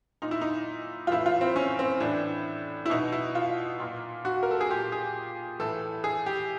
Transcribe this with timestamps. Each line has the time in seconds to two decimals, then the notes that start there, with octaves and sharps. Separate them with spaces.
0.22 A#2 D#4
0.31 E4
0.41 D#4
1.07 F4
1.11 A2 E3 E4
1.26 F4
1.41 C4
1.56 C#4
1.79 C4
2.00 A2 E3 D4
2.86 E4
2.90 B2 D#4
3.12 E4
3.35 F4
3.80 A#2
4.25 F#4
4.43 A#4
4.51 A4
4.61 G#4
4.71 A#2 G4
4.92 G#4
5.59 A2 E3 A4
6.04 G#4
6.26 G4